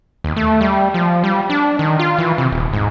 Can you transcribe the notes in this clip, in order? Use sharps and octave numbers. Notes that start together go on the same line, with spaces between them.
D#2
A3
G3
F3
G3
D4
D#3
F4
E3
C3
D#1
G#2